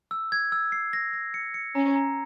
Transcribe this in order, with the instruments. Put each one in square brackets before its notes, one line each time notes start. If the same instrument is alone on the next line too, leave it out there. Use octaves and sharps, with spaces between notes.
[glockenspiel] E6
G#6
E6
C7
A#6
A#6
C#7
C#7
[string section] C#4 [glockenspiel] A#5
[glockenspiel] A#5